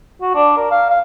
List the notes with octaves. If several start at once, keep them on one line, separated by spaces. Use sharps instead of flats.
F#4
D4
A#4
F5
F5